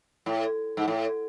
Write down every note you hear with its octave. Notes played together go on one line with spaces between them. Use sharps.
A2
G#2
A2